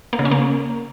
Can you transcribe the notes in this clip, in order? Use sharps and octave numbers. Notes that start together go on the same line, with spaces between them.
A#3
C#3
C#4
A#3